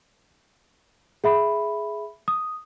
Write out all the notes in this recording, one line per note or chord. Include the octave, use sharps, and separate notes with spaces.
G#4 E5 B5
D#6